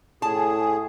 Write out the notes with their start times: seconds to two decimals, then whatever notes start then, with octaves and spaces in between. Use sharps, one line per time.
0.22 A2 G#4 A5